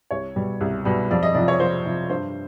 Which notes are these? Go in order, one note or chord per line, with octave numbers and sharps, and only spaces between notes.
C2 C#5
B2 G3
C2
B2 G3
F2 D5
D#5
C3 F3 D5
C#5
F2 C5
C3 F3
G2 C5